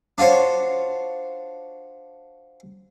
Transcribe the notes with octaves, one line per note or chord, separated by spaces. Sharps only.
D4 F4 F#4 C5 C#5